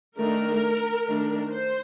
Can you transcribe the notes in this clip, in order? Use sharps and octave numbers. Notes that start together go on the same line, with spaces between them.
D#3 A3 D4 A#4
D#3 A3 D4
C5